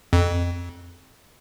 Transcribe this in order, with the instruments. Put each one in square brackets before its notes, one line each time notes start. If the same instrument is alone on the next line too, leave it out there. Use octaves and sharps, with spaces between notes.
[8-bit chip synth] F2